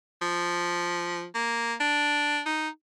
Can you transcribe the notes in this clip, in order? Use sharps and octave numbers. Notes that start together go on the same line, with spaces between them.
F3
A#3
D4
D#4